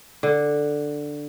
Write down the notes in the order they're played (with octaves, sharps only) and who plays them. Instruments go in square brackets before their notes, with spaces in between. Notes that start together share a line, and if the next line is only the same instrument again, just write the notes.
[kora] D3